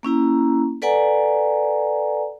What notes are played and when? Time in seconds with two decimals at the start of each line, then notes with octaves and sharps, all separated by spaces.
0.03 A#3 C#4 E4 A#5
0.82 A4 B4 D5 F#5 G#5 A#5